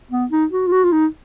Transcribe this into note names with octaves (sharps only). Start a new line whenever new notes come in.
B3
D#4
F#4
F4
F#4
F4
D#4